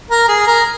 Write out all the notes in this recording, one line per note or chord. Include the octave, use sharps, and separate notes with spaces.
A#4
G#4
A#4